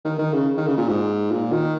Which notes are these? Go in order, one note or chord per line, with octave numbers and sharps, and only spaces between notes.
D#3
D#3
C#3
D#3
C#3
A#2
G#2
A#2
D#3